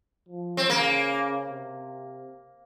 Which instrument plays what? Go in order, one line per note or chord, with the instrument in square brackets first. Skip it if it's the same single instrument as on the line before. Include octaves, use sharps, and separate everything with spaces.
[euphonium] F3
[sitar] C4
[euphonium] C#3 [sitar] A#3
[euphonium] C3